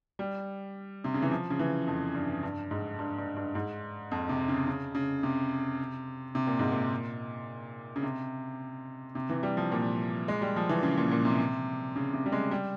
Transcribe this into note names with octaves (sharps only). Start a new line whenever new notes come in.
G3
C3
C#3
E3
F3
C#3
E3
F2
G2
G2
G#2
G2
G2
G2
G#2
F2
C3
C#3
C#3
C#3
C3
C3
A#2
G#2
A#2
C#3
C3
C3
E3
G3
F3
A#2
G#3
G3
F3
E3
C#3
A#2
A#2
C3
C#3
C3
G3
G#3
G3